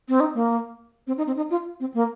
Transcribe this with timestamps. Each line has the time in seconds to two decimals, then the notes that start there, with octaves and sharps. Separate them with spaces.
0.09 C4
0.20 D#4
0.35 A#3
1.07 C4
1.17 D#4
1.27 C4
1.37 D#4
1.50 F4
1.80 C4
1.94 A#3